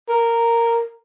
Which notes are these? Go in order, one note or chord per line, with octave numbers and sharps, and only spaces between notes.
A#4